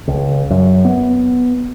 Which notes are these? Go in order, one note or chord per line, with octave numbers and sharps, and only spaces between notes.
C#2
F#2
B3